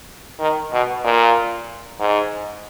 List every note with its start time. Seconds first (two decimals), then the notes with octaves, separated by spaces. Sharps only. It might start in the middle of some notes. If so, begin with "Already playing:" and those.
0.40 D#3
0.72 B2
1.04 A#2
2.00 G#2